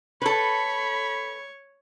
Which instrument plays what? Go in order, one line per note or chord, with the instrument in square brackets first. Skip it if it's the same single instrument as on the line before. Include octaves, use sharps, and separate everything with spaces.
[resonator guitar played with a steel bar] A4 B4 [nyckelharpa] C#5 [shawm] B5